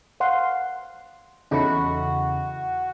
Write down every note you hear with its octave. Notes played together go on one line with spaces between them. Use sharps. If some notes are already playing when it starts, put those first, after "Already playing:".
F5 F#5 C6
E2 C#3 D#4 E4 F#4 A4 B5